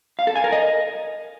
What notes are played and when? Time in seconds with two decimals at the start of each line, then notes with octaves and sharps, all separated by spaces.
0.19 F5
0.27 A4
0.36 G#5
0.44 A#4
0.52 D#5